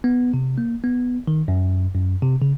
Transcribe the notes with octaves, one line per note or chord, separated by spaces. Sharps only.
B3
C3
A#3
B3
D#3
F#2
F#2
C3
C#3